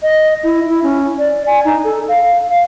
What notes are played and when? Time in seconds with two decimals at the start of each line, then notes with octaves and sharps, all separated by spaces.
0.02 D#5
0.43 E4
0.66 E4
0.83 C#4
1.18 D5
1.46 G#5
1.65 D#4
1.84 A4
2.08 F5
2.48 F5